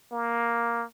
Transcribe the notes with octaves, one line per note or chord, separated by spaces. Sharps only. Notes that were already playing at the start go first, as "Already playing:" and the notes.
A#3